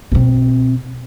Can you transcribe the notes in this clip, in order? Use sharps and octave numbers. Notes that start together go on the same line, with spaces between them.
B2 C4